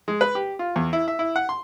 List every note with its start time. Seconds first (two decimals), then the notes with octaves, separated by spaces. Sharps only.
0.08 G#3
0.21 B4
0.35 G4
0.59 F4
0.76 E2
0.93 E4
1.08 E5
1.19 E4
1.36 F#5
1.49 C6